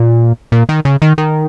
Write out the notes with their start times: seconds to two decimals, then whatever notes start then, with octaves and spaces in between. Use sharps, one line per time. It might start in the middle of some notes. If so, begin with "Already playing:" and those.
Already playing: A#2
0.52 A#2
0.69 D#3
0.85 C#3
1.02 D#3
1.18 D#3